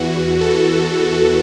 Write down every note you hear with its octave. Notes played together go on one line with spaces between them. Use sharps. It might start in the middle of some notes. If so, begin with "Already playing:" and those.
Already playing: E2 E3 F#4
A4